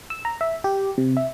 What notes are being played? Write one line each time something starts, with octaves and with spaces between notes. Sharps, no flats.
E6
A#5
E5
G4
C3
E5